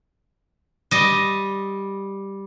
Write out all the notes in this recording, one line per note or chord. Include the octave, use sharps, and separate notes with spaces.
G3 D#5